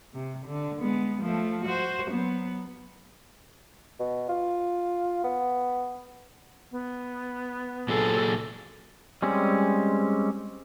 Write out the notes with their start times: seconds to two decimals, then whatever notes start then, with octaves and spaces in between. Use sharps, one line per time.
0.13 C3
0.46 D3
0.80 G#3 B3
1.22 F3 A3
1.65 F#4 C5
2.11 F#3 B3
3.99 B2
4.29 F4
5.24 B3
6.71 B3
7.89 A#2 F#3 G#4 A4
9.22 G3 G#3 C4 C#4